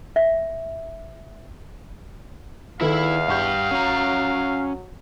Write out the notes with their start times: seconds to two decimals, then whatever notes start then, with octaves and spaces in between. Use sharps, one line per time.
0.16 E5
2.81 E2 D#3 E4 A4 B4 E5 F5
3.28 G2 G4 F#5 C#6 G6
3.71 F#3 C#4 A#5